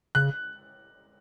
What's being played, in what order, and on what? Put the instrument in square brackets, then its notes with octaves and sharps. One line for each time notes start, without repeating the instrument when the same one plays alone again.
[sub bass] C#3 [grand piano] F#6